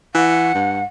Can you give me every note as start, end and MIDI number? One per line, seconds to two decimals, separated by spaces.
0.15 0.53 52
0.15 0.83 78
0.55 0.81 43